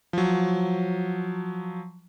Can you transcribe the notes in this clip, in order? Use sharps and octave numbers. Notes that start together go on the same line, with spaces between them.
F3 F#3